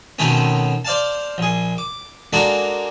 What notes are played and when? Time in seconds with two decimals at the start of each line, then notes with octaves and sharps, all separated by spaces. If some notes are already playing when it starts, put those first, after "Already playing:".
0.19 B2 D#3 A3 C4 C#4
0.85 C5 D5 F5 A5
1.38 A#1 G#4
1.78 D6
2.33 G#3 A#3 D4 F#4 A4